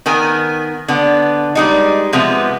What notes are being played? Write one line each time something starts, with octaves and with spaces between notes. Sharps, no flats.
D#3 B3 A#4 G#5
D3 B3
G3 G#3 D#4
C3 F3 G#3 B3